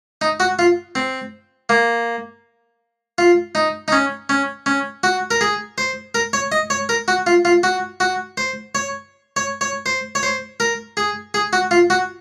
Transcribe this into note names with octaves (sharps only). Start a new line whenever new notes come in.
D#4
F#4
F4
C4
A#3
F4
D#4
D#4
C#4
C#4
C#4
F#4
A#4
G#4
C5
A#4
C#5
D#5
C#5
A#4
F#4
F4
F4
F#4
F#4
C5
C#5
C#5
C#5
C5
C#5
C5
A#4
G#4
G#4
F#4
F4
F#4